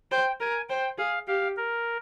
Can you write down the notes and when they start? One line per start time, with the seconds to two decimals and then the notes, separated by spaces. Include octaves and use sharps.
0.11 C5 G5
0.40 A#4 G#5
0.69 C5 G5
0.98 G#4 F5
1.27 G4 F5
1.57 A#4